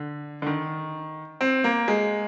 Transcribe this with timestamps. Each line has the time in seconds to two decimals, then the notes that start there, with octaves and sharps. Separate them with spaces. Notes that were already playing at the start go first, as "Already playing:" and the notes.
Already playing: D3
0.42 D3
0.47 D#3
1.41 C4
1.64 A#3
1.88 G#3